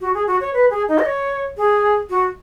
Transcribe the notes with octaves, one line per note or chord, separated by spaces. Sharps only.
F#4
G#4
F#4
C#5
B4
G#4
D#4
D#5
C#5
G#4
F#4